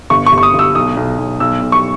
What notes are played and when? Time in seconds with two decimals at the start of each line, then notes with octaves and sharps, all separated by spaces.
0.10 G1 C#6
0.26 C#6
0.32 G1
0.38 C#6
0.43 D#6
0.54 G1 E6
0.75 B1 D#6
0.97 B1
1.19 B1
1.40 B1 E6
1.62 B1
1.72 C#6